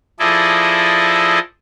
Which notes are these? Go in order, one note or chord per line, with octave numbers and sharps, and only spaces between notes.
F3 E4 G#4 A4 D5 D#5